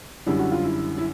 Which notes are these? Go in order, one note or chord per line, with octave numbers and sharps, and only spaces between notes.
F#2 D3 G3 E4
F#4
F4
E4
E4